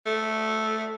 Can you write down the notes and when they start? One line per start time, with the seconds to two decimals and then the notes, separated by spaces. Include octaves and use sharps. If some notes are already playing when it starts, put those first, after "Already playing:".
0.06 A3